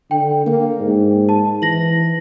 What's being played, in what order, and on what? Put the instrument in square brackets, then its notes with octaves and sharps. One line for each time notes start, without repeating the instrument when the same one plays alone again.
[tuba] D3 [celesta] G5
[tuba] A#3
G#2
[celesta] A5
[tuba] E3 [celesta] A#6 F#7